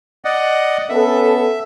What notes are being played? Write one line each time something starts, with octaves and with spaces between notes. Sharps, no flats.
D5 D#5 F#5
B3 C#4 A4 E5